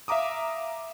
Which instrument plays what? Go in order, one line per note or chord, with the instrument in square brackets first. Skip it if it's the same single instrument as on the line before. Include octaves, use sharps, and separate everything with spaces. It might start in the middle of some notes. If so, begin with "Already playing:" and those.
[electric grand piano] E5 F5 A#5 D6 D#6